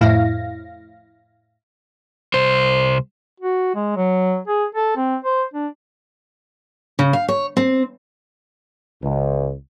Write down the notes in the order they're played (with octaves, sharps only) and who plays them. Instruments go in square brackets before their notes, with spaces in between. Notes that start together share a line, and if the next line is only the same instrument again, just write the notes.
[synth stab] F2 A2 E4 F5 A#6
[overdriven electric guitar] C2 C5
[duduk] F#4
G#3
F#3
G#4
A4
C4
C5
D4
[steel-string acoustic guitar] C#3
F5
C#5
C4
[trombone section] C#2